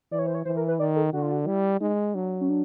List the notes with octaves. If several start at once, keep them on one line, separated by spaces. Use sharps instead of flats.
E3 D5
C#5
C5
C#5
E3 C5
A#4
B4
D#3 D5
A4
D3 F#4
F4
F#4
G3 E4
G#3 D#4
F#3 D4
C#4
D4